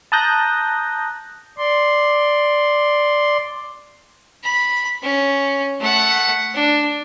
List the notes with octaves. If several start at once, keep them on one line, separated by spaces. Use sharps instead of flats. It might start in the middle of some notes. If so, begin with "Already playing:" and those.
A5 A#5 D#6 F#6 G6 A#6
D5 C6
B5
C#4
A3 F#5
D4